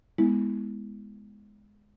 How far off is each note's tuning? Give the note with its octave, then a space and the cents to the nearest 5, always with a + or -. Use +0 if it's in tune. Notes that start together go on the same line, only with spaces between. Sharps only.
G#3 +0 B3 +0 E4 -20